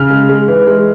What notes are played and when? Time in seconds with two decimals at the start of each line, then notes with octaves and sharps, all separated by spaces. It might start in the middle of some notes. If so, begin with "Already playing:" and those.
Already playing: C#3 F6
0.10 G#3
0.29 G#3
0.48 E3
0.67 G#3